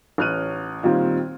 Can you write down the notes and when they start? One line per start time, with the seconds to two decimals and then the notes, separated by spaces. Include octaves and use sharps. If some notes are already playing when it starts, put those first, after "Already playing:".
0.18 A1 C#5 F6 F#6 D#7
0.83 A#2 D#3 G3 C4